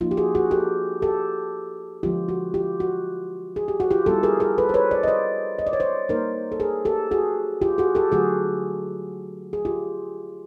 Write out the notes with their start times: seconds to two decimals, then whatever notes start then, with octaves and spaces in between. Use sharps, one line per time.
0.01 F3 A#3 D#4 F4
0.11 G4
0.17 F#4 G#4
0.35 F#4 G#4
0.51 G4 A4
1.02 G4 A4
2.03 D3 F3 G#3 B3 F4 G4
2.29 F#4
2.54 F4 G4
2.80 F#4
3.56 G#4
3.68 G4
3.80 F#4
3.91 F4 G4
4.06 G3 B3 E4 G4 A4
4.23 G#4 A#4
4.40 G#4 A#4
4.58 A4 B4
4.69 C5
4.74 B4 C#5
4.91 C5 D5
5.03 D#5
5.08 C5 D5
5.59 D#5
5.67 D5
5.73 C#5
5.80 C5 D5
6.09 G3 A#3 D#4 A#4 C5
6.52 A4
6.60 G#4 A#4
6.85 G4 A4
7.11 F#4 G#4
7.61 F4 G4
7.78 F#4 G#4
7.95 G4 A4
8.12 D3 F#3 A3 F#4 G#4
9.53 G#4
9.65 F4 G4